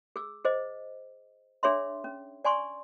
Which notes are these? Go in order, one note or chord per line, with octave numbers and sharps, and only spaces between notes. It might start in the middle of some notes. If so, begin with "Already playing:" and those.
G#4 E6
G#4 C5 D#5
D4 G#4 C#5 E5 C6
C#4
D5 G#5 C6 C#6